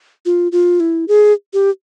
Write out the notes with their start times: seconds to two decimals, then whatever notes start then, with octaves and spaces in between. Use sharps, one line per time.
0.26 F4
0.52 F4
0.80 E4
1.08 G#4
1.53 G4